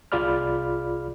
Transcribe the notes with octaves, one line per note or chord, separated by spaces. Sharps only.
C2 F4 G#4 D5 B5 F6